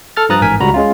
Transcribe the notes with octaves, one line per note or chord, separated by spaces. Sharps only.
A4 F6 A6
G2 F3 A#5 D#6 F#6 A6
A1 G#2 A#4 G#5 B6
C#2 G3 F#4 A#5 B5
G#3 C#4 F4